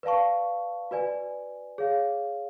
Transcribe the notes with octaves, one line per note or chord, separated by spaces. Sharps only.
B4 D5 F5 A5 C#6
F#4 B4 D5 G#5
G#4 C#5 F5